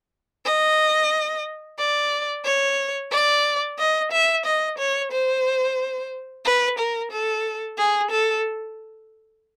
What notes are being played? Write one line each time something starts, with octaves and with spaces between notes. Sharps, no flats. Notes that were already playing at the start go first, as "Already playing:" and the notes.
D#5
D5
C#5
D5
D#5
E5
D#5
C#5
C5
B4
A#4
A4
G#4
A4